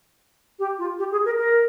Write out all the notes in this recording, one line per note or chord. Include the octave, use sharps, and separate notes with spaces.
G4
F4
G4
G#4
A#4
A#4